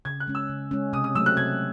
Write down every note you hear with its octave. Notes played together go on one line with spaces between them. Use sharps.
C#3 G#6
F#6
G#3 C#4
E6
C#3
G#3 C#4
C3 D#6
D#6
F#3 A3 C4 E6
F#6
C3 G#6